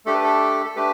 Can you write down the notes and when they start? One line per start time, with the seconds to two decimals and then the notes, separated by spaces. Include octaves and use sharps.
0.06 A3 D4 G4 A4
0.14 B4
0.24 A4
0.65 A4
0.76 A3 D4 G4 B4